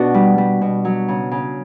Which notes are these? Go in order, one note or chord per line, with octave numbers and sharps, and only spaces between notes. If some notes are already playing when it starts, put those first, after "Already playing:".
Already playing: B2 B3 D4 F#4
G3
G3
B2
F#3
C#3
C#3